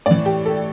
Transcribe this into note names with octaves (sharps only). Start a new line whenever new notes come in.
A2 E3 D5
G4
A4